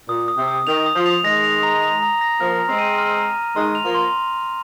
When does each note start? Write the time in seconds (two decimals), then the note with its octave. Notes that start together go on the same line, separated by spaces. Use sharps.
0.09 A#2 D#6
0.28 D#6
0.38 C3
0.48 D#6
0.67 D#3 F7
0.86 D#6
0.96 F3
1.06 F7
1.24 D#3 G#3 A#6
1.44 F7
1.63 A#5
1.82 F7
2.02 A#5
2.21 A#6
2.40 F3 A#3 F6
2.59 A#5
2.69 G#3 C4
2.79 D#7
2.98 F6
3.17 A#5
3.36 A#5
3.56 D#3 G#3 C6
3.75 F7
3.85 F3 A#3
3.95 C6